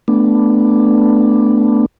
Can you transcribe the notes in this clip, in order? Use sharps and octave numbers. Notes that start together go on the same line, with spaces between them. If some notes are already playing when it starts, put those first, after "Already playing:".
A3 B3 D4